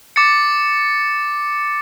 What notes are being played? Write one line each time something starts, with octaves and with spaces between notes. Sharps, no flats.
D6 A6 C#7